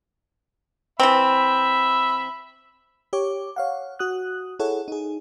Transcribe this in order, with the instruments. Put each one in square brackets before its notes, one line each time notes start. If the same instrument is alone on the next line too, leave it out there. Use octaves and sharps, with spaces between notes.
[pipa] E3 C4 [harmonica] E5 B5
[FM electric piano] G4 C#5 D6
C#5 F5 F#5
F#4 D#6 F#6
E4 G#4 A4 C#5 F#5
D#4 G#4